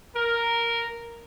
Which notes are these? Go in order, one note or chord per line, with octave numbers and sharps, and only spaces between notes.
A#4